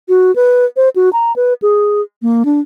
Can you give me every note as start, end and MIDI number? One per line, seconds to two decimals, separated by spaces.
0.09 0.34 66
0.36 0.65 71
0.77 0.89 72
0.96 1.10 66
1.13 1.35 82
1.36 1.54 71
1.62 2.01 68
2.22 2.43 58
2.45 2.60 62